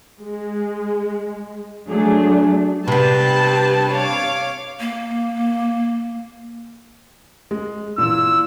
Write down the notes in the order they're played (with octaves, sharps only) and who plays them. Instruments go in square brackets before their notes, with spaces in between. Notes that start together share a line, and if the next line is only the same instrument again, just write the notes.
[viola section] G#3
[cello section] F#3 D4 [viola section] A3 G#4
[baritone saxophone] G2 [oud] C3 B3 [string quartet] G4 B4 [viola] A5
[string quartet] C#5 F5 D6
[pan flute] A#3
[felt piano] G#3
[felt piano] A#2 E3 [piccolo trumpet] E6